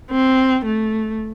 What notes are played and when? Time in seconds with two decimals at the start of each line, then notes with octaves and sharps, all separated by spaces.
0.11 C4
0.65 A3